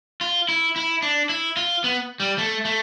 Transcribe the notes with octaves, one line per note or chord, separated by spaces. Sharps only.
F4
E4
E4
D4
E4
F4
B3
G3
A3
A3